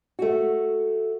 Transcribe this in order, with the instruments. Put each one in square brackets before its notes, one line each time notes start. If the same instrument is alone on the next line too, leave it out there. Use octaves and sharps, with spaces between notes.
[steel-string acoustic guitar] A3 F#4